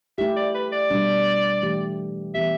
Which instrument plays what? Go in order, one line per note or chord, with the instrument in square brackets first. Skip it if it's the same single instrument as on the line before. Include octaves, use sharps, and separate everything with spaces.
[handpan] A3 E4 G4 [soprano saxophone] E5
[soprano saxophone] D5
B4
D5
[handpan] B2 G3 D4
E3 A3 G4
[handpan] E3 B3 G4 [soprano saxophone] E5